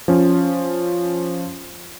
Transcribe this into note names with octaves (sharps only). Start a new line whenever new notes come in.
F3 C#4